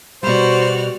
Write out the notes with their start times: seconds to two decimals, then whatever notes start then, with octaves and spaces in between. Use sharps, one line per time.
0.23 B2 G3 F#4 C5 D5 F6